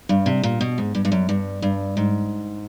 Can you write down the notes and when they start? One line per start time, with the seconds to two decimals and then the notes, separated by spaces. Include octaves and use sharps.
0.09 G2
0.26 C3
0.44 A#2
0.61 B2
0.78 G#2
0.95 G2
1.05 G2
1.12 F#2
1.29 G2
1.62 G2
1.97 G#2